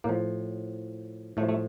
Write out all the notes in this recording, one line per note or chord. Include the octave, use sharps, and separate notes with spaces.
A2 F3 A#3
A2 F3 A3
A3